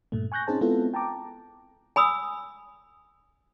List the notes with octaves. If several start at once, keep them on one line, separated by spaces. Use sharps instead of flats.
G2 A#2 A3
G#5 C#6 F#6 G6 A#6
C4 C#4 D#4 G#4 C5 A5
G#3 B3 C4 E4 F4 A4
G5 A5 A#5 D6
G#5 B5 D#6 E6